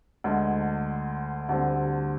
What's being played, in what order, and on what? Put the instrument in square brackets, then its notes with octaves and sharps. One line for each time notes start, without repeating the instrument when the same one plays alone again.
[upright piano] D2 D3 G#3
D2 D3 G3 C4